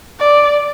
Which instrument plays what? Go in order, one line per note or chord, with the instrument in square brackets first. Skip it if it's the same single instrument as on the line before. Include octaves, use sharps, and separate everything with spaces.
[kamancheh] D5